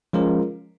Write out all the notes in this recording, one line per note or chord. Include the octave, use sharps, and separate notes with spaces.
F3 G#3 C#4 F4 A#4